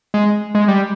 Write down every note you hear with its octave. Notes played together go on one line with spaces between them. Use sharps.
G#3
G#3
G3